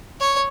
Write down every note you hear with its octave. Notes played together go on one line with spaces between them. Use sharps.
C#5